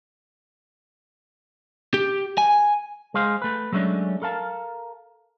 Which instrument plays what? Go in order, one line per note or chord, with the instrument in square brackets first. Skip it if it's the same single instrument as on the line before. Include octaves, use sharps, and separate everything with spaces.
[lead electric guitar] G4
G#5
[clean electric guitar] G#3 G#4 C5 F5
A3 B4
F#3 G#3 A3 C#4 D4
A4 A#4 F5 A5